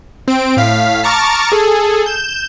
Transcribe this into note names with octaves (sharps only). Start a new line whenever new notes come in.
C4 D7
A2 F5 B6
A5 A#5 C#6 D6 F6 A6
G#4 A4
G6 E7